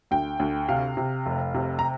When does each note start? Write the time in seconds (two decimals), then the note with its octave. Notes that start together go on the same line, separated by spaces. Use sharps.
0.11 D2 G5
0.40 D2
0.69 C3 F5
0.97 C3
1.26 F1
1.55 C3
1.79 A#5